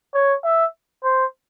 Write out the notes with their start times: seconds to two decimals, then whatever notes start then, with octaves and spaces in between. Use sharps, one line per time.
0.14 C#5
0.44 E5
1.04 C5